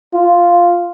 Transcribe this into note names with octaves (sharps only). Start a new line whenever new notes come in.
F4